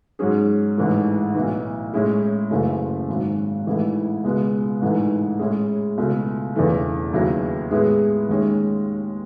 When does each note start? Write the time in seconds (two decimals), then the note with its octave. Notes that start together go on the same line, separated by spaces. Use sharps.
0.19 G#2 F#3 C#4 G#4
0.77 A1 G#2 E3 A3
1.34 B1 A2 E3
1.93 A2 G#3 C#4 E4 G#4
2.50 F#1 F#2 C#3 E3 A3
3.09 G#1 G#2 F#3
3.66 A1 G#2 E3 A3 E4
4.24 C#2 B2 G#3 B3
4.81 A1 G#2 E3 A3 D#4
5.39 A2 G#3 C#4 E4 G#4
5.98 C#2 B2 A3 E4
6.56 E1 E2 C#3 E3 A3
7.13 D#2 C#3 F#3 A3 E4
7.71 A2 G#3 B3 E4 G#4
8.29 D#2 D#3 G#3 C#4